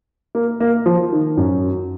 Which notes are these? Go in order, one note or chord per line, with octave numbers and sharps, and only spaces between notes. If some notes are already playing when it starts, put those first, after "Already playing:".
A#3
A#3
F3
D#3
F#2